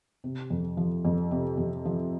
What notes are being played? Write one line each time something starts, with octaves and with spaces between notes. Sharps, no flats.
C3
F2
F3
F2
C3
F2
F3